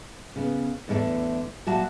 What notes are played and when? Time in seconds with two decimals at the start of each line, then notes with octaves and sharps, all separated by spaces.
0.36 C#3 B3
0.88 E2 A2 D3 G#3 A3
1.67 A#2 F#3 F#4 E5 A5